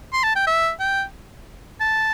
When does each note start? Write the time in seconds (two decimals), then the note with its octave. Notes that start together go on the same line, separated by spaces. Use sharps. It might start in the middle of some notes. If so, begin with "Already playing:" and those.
0.13 C6
0.24 A5
0.35 G5
0.47 E5
0.80 G5
1.80 A5